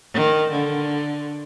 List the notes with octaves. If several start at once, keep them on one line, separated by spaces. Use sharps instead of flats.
D#3
D3